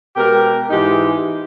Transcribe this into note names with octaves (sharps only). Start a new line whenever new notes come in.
B2 G#3 G4 A#4
G#2 E3 G#3 D#4 G4